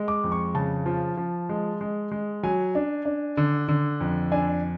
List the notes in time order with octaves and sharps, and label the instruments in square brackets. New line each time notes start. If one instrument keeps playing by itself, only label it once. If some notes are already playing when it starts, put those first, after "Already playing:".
Already playing: [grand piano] G#3
D6
F2
C#6
C#3 A5
F3
F3
G#3
G#3
G#3
F#3 G#5
D4
D4
D3
D3
F2
D4 G#5